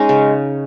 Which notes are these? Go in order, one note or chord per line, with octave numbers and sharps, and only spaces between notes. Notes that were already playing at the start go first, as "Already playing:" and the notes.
Already playing: G#3 C#4 D#4
C#3